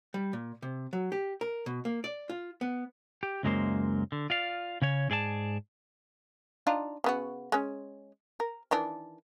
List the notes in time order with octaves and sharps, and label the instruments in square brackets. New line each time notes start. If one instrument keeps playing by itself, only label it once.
[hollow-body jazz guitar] G3
A#2
C3
F#3
G4
A#4
B2
A#3
D5
F4
B3
[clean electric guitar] G4
C#2 F#2 F#3 G#3 A#3 C5
D3
F4 D5 F5
C#3 C#4 C#5
G#2 G#4 D5 D#5 A5
[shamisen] D4 D#4 F4
C#3 B3 F#4
G#3 C#4
A#4
D#3 E3 D4